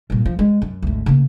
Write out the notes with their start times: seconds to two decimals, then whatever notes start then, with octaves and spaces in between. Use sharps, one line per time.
0.10 G2 A#2
0.25 F3
0.39 G#3
0.62 F#2
0.82 G#1 D2
1.06 C#3 A#3